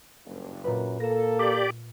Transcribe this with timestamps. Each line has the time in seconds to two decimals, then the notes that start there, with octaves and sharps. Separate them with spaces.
0.25 F#1 G2
0.64 F#2 A#2 B4
1.00 A#3 A4 A#6 E7
1.39 G4 D5